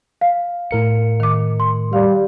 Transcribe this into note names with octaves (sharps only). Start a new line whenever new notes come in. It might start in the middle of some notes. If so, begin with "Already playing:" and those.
F5
A2 A#4 C#7
D#3 D6
C6
G3 F5